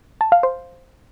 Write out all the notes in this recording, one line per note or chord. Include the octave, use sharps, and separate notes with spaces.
A5
F5
C5